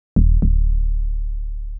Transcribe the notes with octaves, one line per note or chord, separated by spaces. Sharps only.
D#1
D1